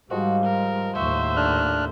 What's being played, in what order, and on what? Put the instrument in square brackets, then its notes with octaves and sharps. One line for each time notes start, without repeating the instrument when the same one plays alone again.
[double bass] G#2 G3 [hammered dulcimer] D#3 F3 G#3 [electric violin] F#4
[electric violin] A#4
[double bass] D#2 A2 [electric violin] C5 E5 [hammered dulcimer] F#5 C#6
[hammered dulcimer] D3 [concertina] D4 F6 F#6